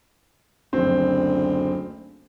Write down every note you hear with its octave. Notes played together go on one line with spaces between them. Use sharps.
F#1 D2 C4